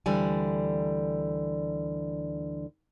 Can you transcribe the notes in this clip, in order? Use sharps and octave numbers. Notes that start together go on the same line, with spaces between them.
D2 D3 E3 G3 G#5